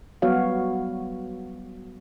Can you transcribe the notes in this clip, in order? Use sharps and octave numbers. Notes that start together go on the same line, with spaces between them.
F#3 G3 B3 F#4 C#5 F5